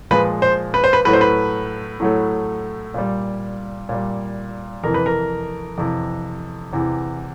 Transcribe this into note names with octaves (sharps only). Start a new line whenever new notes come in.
A#2 F3 G#3 B4
C5
B4
C5
B4
A2 F#3 A3 B4
C5
B4
A2 F#3 A3
A#2 G3
A#2 G3
F2 C3 E3 A#4
B4
A#4
F2 C3 E3
E2 C3 E3